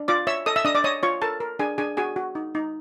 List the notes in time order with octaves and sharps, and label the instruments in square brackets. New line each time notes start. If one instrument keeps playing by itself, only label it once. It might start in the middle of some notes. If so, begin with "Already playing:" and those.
Already playing: [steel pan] D4
F4 D5 D6
C#5 E5 E6
A4 D#5 D#6
E5 E6
D4 D#5 D#6
D5 D6
C#5 D#5 D#6
F4 C#5 C#6
A4 A#4 A5
A#4
D4 G#4 G#5
D4 G#4 G#5
F#4 G#4 G#5
F#4
D#4
D#4